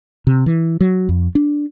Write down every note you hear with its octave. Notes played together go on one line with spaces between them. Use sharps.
C3
E3
F#3
F2
D4